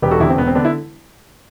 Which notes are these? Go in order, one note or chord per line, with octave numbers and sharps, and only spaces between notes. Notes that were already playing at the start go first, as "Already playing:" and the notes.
E1 G4 B4
F#4 A4
E2 D3 E4 G4
C4
E1 B3
C4
D3 B3 D4
E4